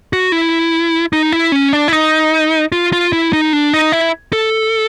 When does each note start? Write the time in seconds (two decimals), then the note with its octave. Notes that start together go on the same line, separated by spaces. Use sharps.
0.13 F#4
0.32 E4
1.13 D#4
1.32 E4
1.52 C#4
1.73 D4
1.88 E4
1.92 D#4
2.72 F4
2.93 F4
3.13 E4
3.33 D#4
3.53 D4
3.73 D#4
3.92 E4
4.33 A4